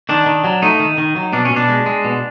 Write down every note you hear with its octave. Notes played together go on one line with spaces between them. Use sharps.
D#3 D4
D#3
F#3
A3 D#4
D#3
D#3
F#3
B2 D4
C#4
B2
D4
G#3
G#3
B2